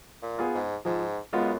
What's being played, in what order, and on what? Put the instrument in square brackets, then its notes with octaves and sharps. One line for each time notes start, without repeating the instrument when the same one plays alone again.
[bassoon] A#2
[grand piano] B3 F4 G#4
[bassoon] G#2
[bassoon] G#2 [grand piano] F3
[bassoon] F#2 [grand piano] G#3 B3 F4